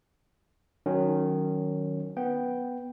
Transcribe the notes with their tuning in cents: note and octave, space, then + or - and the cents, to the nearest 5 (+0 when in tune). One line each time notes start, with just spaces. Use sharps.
D#3 -20 F#3 +0 C#4 +0
B3 +0 G5 +0